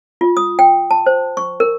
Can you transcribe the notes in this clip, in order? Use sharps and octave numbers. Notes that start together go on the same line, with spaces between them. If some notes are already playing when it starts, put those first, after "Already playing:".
F4
D#6
G5
A5
C5
C#6
A#4